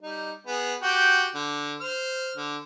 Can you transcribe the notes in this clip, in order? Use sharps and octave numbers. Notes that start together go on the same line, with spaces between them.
G3 D#4
B3 G#4
F#4 G4 G5
D3
C5 F6
D3